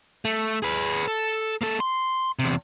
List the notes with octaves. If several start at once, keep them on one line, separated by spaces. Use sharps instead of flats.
A3
G#4 B4
A4
A#3 A4
C6
E2 C3